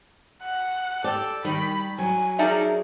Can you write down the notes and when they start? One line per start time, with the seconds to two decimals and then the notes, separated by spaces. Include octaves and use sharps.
0.42 F#5
1.04 G4 A4 D5
1.45 D#3 G3 B5
1.98 F#3 G#5
2.39 D#4 G#4 A#4 D5 E5 A5